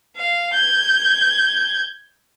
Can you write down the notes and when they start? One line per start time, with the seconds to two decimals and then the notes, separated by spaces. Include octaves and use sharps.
0.16 F5
0.54 G6 G#6